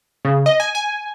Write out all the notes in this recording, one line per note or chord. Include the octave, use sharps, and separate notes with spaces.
C#3
D#5
G#5
G#5